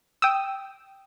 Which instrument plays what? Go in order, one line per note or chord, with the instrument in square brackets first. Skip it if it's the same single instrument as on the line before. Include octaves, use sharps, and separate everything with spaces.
[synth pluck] G5 D#6 E6